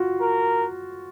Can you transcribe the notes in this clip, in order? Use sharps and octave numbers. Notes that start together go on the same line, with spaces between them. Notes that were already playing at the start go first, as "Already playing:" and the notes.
Already playing: F4 F#4
A#4